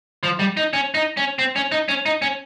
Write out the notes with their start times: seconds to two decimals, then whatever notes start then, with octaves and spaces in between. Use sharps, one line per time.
0.23 F3
0.39 G3
0.57 D#4
0.73 C#4
0.94 D#4
1.17 C#4
1.39 C4
1.56 C#4
1.72 D#4
1.89 C#4
2.06 D#4
2.22 C#4